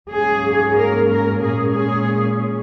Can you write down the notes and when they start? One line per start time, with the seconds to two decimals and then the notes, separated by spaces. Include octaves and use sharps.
0.12 G#2 F#3 A#3 C#4 G#4
0.78 A#4
1.10 A#4
1.43 A#2 G#3 C#4 G#4
1.76 G#4